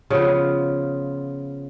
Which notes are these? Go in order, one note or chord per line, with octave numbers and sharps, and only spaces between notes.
C#3 F3 B3 F4